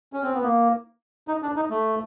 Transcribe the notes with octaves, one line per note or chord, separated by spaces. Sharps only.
C#4
C4
B3
A#3
D#4
D4
D#4
A3